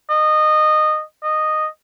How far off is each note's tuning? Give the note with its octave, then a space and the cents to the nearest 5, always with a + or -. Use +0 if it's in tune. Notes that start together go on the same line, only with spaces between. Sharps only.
D#5 -20
D#5 -10